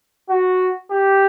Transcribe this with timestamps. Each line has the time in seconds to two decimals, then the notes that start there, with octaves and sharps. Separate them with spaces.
0.30 F#4
0.90 G4